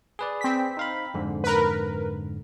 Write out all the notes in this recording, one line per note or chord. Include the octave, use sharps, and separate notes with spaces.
G#4 B4 D5
C4 B6
D#4 F5 B5
F2 G#2 D3
A#4 B4